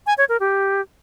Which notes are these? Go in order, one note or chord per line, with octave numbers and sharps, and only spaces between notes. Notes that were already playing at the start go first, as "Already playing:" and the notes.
G#5
C#5
A#4
G4